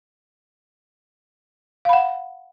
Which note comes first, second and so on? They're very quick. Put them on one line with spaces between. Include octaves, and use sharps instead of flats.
F5 B5 F#5